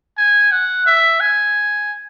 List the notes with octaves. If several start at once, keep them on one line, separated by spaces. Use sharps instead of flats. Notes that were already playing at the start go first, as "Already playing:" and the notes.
G#5
F#5
E5
G#5